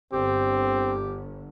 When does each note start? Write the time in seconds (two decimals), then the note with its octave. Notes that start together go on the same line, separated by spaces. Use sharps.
0.13 G1 C4 G4